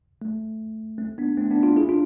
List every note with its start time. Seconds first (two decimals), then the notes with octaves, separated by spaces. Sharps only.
0.22 A3
0.98 A3 C4
1.18 B3 D4
1.37 A3 C4
1.50 B3 D4
1.63 D4 F4
1.76 E4 G#4
1.89 D4 F4